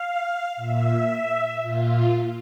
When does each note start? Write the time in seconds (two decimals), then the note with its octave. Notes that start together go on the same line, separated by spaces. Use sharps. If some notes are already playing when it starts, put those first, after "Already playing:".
Already playing: F5
0.56 A#2 E5
1.62 A#2 F4